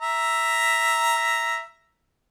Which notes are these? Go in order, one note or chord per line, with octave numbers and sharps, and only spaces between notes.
E5 A#5